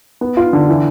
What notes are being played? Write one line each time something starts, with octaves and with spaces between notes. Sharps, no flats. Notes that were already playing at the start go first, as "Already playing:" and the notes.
B3
F4
D3
E3